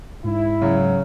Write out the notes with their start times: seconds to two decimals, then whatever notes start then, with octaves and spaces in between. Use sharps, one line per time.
0.24 G#2 E4
0.62 C#3 F#3